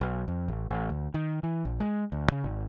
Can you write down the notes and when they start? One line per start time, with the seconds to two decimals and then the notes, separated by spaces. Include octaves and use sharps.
0.01 B1
0.28 F2
0.48 A1
0.71 A1
0.90 D2
1.14 D#3
1.43 E3
1.65 A#1
1.80 G#3
2.12 D2
2.32 C#3
2.44 G#1